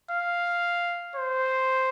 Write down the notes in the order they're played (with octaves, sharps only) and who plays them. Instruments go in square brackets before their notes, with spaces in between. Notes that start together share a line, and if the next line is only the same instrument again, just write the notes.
[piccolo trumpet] F5
C5